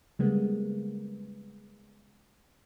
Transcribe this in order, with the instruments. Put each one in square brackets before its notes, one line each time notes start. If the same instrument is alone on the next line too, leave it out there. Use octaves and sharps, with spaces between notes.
[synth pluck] C#3 G3 G#3 A#3 B3